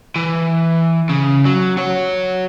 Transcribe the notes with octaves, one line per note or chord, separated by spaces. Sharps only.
E3
C#3
F#3
F#4 C#5